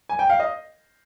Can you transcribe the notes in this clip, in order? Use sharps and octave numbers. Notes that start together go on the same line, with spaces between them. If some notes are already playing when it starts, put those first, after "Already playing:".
G#5
G5
F5
D#5